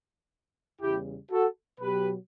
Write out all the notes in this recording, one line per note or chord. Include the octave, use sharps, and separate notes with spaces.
E2 C#3 G3 E4 G4
F#4 A4
B2 F#3 G4 B4